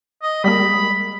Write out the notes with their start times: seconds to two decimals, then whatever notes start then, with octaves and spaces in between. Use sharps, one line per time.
0.22 D#5
0.44 G3 G#3 A#3 B5